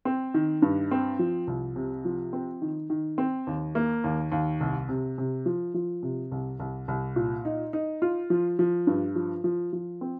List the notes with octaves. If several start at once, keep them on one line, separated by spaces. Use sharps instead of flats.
C4
D#3
G2
C4
F3
C2
C3
F3
C4
D#3
D#3
C4
D#2
A#3
D#2
D#2
C2
C3
C3
F3
F3
C3
C2
C2
C2
A#2
D#4
D#4
F4
F3
F3
G2
F3
F3
F3
C4